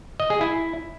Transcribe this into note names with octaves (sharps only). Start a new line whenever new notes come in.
D#5
G#4
E4